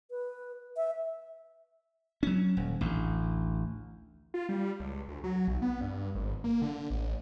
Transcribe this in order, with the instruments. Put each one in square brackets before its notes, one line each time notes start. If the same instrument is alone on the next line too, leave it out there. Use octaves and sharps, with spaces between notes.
[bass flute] B4
E5
[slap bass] F#3 C#4
D#1
A1 D2
[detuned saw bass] F4
G3
C#2
D2
F#3
B1
B3
G2
G#1
A#3
D3
A1